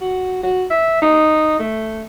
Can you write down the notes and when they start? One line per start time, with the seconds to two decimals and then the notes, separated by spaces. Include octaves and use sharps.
0.01 F#4
0.43 F#4
0.71 E5
1.02 D#4
1.59 A3